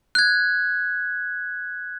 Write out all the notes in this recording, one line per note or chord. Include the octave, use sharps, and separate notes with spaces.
F#6 G#6